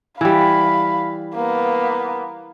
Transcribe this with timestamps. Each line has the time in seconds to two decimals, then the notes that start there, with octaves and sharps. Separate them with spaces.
0.21 E3 G3 F5 B5
1.35 A#3 B3